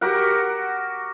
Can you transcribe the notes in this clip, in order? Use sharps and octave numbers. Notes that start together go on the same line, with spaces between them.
F#4 G4 A#4 F#5